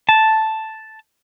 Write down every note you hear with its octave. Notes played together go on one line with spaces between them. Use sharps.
A5